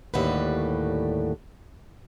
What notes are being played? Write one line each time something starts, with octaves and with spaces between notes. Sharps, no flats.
D#2 A2 D3 G3 F#4 B4